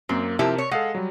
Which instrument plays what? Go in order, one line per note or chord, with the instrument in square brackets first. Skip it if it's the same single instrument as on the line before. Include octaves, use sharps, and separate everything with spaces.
[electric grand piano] F#2 A#3 [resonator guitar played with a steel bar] C4
[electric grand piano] C3 A#4 A5 [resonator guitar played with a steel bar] F3 E4 G4
[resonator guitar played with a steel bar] C#5
[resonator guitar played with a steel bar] G#3 [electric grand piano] A4 F5 F#5
[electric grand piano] F#3 G3